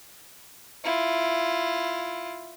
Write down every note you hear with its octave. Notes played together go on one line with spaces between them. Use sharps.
E4 F4